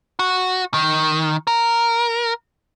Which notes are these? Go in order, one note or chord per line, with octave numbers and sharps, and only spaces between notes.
F#4
D#3
A#4